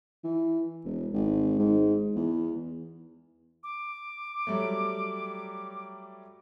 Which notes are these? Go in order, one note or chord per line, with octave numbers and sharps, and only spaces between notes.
E3
E1
G#1
G#2
E2
D6
F#3 G3 A3